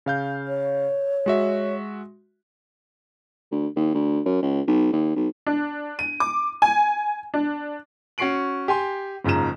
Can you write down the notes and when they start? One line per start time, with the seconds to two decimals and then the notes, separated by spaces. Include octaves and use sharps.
0.06 C#3 F5 G6
0.48 C#5
1.26 G#3 F#4 E5
3.51 D2
3.76 D#2
3.94 D2
4.26 F#2
4.42 C#2
4.67 B1
4.93 D#2
5.16 B1
5.47 D4
5.99 D#7
6.20 D6
6.62 G#5
7.34 D4
8.18 C#4 F#4 C#6 C7 D7 F#7
8.68 G4 G#5 C6
9.25 F#1 G#2 C#3 F3 A#5 E7